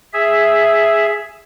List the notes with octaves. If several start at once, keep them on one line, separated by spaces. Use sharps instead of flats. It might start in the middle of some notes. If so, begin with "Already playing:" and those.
G#4 E5